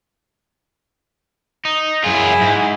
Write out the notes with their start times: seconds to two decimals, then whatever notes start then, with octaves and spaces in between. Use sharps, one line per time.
1.65 D#4
2.04 F#2 E4 F4 G#4
2.41 G#2